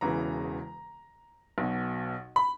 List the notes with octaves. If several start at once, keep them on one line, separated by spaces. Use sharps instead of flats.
E1 E2 C#3 E3 A#5
B1 B2
B5